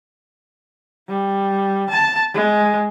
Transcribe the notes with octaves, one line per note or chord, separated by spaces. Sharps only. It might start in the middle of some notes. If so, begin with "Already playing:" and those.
G3
A5
G#3